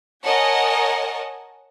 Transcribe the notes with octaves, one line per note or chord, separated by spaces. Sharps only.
A#4 C#5 D#5 F#5 G#5 A5